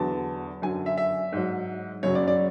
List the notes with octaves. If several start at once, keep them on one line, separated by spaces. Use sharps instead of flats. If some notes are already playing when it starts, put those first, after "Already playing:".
Already playing: E2 D3 F#3 A5
F#2 D3 F#3 G#5
E5
E5
G#2 F#3
F#2 C#3 F#3 C#5
D5
D5